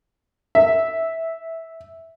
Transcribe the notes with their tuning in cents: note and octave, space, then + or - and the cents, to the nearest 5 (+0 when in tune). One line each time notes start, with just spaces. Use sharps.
E5 -10